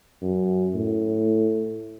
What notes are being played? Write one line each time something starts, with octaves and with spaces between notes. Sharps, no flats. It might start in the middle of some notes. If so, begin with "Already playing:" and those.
F#2
A2